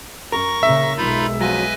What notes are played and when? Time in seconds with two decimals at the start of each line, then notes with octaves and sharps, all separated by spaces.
0.32 F#2 A#4 C#6 A#6
0.63 A#2 C#3 E5
0.97 B1 G#3 D#4 F4 B5
1.41 F#2 F3 F#3 B4 D#5 G#5